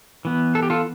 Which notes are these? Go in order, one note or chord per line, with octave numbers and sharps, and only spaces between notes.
E3 B3
A4
G4
F4 A4